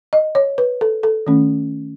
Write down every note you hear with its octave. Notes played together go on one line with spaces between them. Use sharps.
D#5
C#5
B4
A4
A4
D#3 A3 C#4